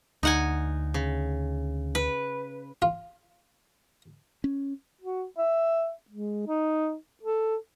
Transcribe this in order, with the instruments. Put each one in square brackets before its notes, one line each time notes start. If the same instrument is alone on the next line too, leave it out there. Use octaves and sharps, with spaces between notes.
[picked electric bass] D2 [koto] D#4 F#5 G#5
[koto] C#3
B4
[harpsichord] F4
[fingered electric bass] C#4
[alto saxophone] F#4
E5
G#3
D#4
A4